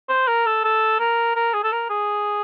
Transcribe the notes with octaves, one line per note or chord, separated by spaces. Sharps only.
C5
A#4
A4
A4
A#4
A#4
G#4
A4
A#4
G#4